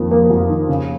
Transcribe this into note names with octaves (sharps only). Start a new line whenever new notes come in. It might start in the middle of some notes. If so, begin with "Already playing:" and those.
Already playing: F2 D#3 A#3
A#3
F2
D#3
C#3